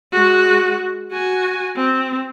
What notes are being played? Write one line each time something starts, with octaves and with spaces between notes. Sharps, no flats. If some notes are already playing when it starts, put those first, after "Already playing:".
G#3 F#4
F#4 G#5
C4